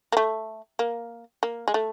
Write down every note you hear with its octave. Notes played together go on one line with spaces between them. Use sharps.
A#3
A3
A#3
A#3
G#3
A3